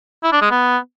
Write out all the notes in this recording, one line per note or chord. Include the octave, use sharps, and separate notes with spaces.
E4
D4
G#3
B3